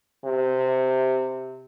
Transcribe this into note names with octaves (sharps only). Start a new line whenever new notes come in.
C3